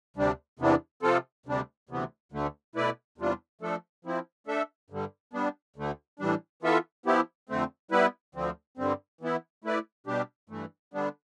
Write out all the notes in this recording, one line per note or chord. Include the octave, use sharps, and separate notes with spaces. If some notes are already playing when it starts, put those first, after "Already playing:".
D2 C3 G3 D4
E2 C3 E3 B3 D4
C3 F3 C4 F4 A4
D2 C3 G3 D4
D2 C3 E3 B3
D2 D3 A3
B2 A3 E4 B4 D5
E2 C3 G3 D4 F4
F3 A3 D4 A4
F3 C4 E4
A3 D4 A4 E5
G2 D3 G3
G3 B3 D4
D2 D3 A3
A2 E3 G3 D4
E3 B3 F4 A4 E5
F3 B3 E4 G4
F2 D3 A3 C4
G3 B3 E4 B4
D2 D3 F3 C4
G2 D3 G3 C4
E3 B3 E4
A3 E4 B4 D5
B2 G3 D4 G4
G2 E3 A3
D3 G3 B3 D4